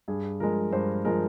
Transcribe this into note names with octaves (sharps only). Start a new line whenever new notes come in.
G2 G#4
F3 G#3 A#4
G2 C5
F3 G#3 A#4